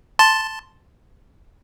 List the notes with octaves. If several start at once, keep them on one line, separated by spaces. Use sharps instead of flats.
A5 C6 A6